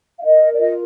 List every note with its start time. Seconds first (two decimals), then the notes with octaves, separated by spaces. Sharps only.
0.19 F5
0.24 A#4 D#5
0.54 D5
0.59 F4 D#5